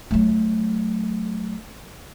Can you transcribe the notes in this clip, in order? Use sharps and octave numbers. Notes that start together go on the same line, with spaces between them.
F#3 A3